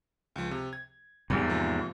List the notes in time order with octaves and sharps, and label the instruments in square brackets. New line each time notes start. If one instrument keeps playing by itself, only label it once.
[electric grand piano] C#2 F3
C3
G#6
[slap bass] E2 G#2 [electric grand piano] G3
[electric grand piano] C3 F3 A#3